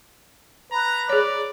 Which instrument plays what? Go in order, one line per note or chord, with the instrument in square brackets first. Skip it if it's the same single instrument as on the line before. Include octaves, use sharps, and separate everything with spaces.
[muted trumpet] B4 [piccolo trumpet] A#5
[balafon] G#4 C#5 [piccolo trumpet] D5